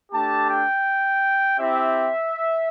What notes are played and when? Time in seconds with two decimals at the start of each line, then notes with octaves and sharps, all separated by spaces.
0.12 A3 D4 G4 A5
0.49 G5
1.59 C4 E4 G4 E5